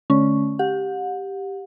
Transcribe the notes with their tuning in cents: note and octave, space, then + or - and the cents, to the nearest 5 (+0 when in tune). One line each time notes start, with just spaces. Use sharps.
D3 +0 A3 -35 C#4 +0
G4 +0 F#5 -35